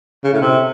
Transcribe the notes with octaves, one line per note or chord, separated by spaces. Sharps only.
C#3
A2
C3